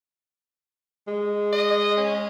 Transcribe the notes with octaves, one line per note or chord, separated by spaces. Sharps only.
G#3
D#5
C#4